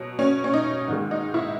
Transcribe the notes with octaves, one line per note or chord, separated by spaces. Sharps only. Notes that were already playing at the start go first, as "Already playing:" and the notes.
Already playing: B2 F#3
C#4
C#4
D#4
G#2 D#3 G#3
D#4
E4